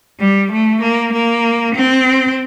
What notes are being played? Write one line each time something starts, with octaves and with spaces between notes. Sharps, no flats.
G3
A3
A#3
A#3
C4